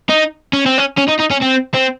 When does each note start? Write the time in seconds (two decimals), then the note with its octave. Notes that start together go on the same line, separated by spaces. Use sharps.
0.09 D#4
0.53 C#4
0.66 C4
0.78 C#4
0.98 C#4
1.09 D#4
1.20 D#4
1.31 C#4
1.42 C4
1.75 C4